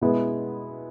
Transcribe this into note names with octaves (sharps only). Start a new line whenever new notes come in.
B2 G#3 B3 E4